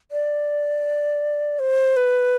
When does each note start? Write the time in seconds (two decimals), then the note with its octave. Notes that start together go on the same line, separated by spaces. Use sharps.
0.11 D5
1.59 C5
1.96 B4